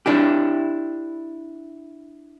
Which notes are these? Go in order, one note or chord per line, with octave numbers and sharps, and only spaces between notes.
D4 E4 G4